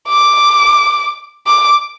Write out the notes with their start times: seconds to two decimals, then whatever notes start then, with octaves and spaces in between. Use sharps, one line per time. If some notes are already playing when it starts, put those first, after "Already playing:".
0.08 D6
1.47 D6